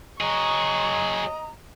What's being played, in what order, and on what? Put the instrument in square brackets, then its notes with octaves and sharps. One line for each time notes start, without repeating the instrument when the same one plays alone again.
[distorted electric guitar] F#3 G#4 [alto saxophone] D#5 [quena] A#5 [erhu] C#6